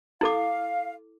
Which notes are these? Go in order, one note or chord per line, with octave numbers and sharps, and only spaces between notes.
E4 A4 F5 D6